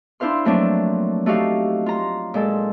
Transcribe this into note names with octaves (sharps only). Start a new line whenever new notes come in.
D4 E4 C5 F5 C6
F3 F#3 A3 A#3 C4 D4
A3 D#4 F#4 G4 F5 A5
F4 A#5
A#2 G#3 A4